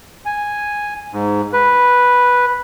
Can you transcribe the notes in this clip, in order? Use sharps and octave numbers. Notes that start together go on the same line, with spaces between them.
G#5
G#2
B4